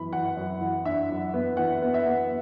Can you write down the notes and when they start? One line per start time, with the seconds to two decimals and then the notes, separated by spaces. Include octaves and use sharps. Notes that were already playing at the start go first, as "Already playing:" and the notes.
Already playing: F#2 E3 B3 B5
0.13 E3 F#5
0.37 F#2
0.61 E3
0.85 D4 E5
1.10 F#2
1.34 B3
1.57 E3 F#5
1.82 B3
1.94 E5
2.06 B3